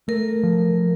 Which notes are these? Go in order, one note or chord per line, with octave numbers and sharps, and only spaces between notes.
A3 A#4
F3